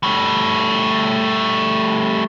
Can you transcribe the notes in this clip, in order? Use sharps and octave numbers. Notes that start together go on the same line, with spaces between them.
G3 A3